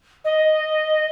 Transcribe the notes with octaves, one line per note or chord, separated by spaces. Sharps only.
D#5